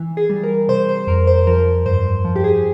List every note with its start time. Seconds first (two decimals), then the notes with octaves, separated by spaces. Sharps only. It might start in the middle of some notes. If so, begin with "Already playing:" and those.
Already playing: E3
0.17 G#4
0.30 G3
0.44 A#4
0.69 C3 C5
0.89 C5
1.07 F2 A#4
1.27 C5
1.47 F3 A#4
1.86 G2 C5
2.25 F3
2.36 G4
2.44 G#4